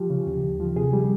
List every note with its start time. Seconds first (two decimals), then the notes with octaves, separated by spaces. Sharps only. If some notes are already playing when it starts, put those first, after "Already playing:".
Already playing: F3 G4
0.10 C#3
0.27 D#2
0.43 D#2
0.60 F3
0.76 C3 G#4
0.93 G3